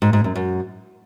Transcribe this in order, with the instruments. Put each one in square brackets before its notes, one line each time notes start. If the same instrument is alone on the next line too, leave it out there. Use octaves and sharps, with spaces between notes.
[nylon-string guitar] G#2
G#2
F#2
F#2